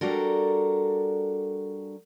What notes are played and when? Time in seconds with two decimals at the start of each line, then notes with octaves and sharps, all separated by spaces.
0.01 G3 D4 F#4 A4 A#4